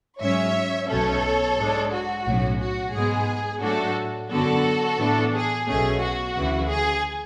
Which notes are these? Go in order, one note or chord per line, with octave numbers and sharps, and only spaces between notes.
G#2 F#3 C#4 C#5 E5
B1 B2 A3 C#4 A4 C#5
G#2 G#3 D4
F#4
B1 A2 F#3 C#4
F#4
G#2 G#3 B3 G#4
A2 F#3 A3 D4 F#4 A4
F#2 D3 F#3 B3 F#4 A4
A2 E3 B3 D4
G#4
B1 B2 A3 C#4 G#4
F#4
D2 C#3 E3
G#4